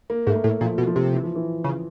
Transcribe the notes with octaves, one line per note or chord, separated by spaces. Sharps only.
A#3
G#2 A3
A#3
A2
A#2 F3
B2
F3
C3
E3
F3
E3
C#3